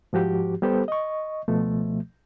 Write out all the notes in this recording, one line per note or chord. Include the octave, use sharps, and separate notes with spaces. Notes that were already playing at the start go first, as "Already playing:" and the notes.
G#2 F3 F#4 G4
G3 B3 G4 A4 C5
D#5 C#6
C#2 B2 F3 A3